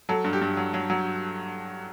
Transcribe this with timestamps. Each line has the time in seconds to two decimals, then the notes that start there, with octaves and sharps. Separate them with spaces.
0.09 F#3 A4
0.24 G2
0.33 G4
0.42 G2
0.57 F#3
0.74 F#3
0.90 F#3